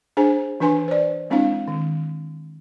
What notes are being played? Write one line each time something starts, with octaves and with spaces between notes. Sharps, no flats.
D4 G#4 C5 G#5
E3 D4 B4 G#5 C6
C5 D5
G#3 C4 D4 E4 F5
D#3